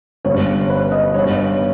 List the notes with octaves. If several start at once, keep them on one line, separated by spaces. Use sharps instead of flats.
G1 G2 G3 C#4 C#5
B4
D#5
G2 D#3 G3 B3 C#5